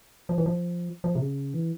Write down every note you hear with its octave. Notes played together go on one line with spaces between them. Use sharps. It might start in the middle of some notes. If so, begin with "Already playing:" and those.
F3
E3
F3
F3
C3
C#3
E3